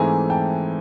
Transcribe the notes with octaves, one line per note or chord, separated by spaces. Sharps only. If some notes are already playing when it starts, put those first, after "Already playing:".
Already playing: G#2 E3 A3 C4 G#5 A#5
G5 A5